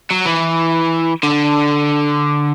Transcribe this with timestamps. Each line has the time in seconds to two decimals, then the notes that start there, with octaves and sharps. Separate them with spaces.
0.11 F#3
0.26 E3
1.23 D3